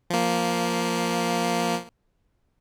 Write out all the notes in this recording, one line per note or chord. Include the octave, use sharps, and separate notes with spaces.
F3 A#3